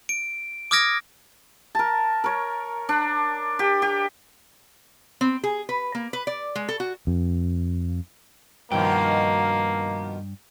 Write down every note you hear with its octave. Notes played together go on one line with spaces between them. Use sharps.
D7
D6 D#6 F6 G#6 A#6 D7
A#4 A5
A#4 C#5
D4
G4
G4
C4
G#4
B4
A#3
B4
D5
G#3
A4
F#4
F2
G2 B2 D#3 F3 A#3 G5